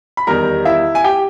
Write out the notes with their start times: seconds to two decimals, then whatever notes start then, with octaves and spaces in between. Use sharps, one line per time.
0.17 B5
0.27 E2 D#3 G3 A#4 A#5
0.65 E4 E5
0.95 G#5
1.04 G4 G5